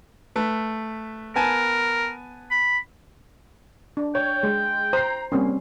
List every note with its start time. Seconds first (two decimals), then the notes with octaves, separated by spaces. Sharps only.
0.36 A3 B4
1.36 B3 A#4 G#5 A5
2.51 B5
3.97 D4
4.15 C#5 G5
4.43 G#3
4.93 C5 A#5 C7
5.32 G3 A#3 C4 C#4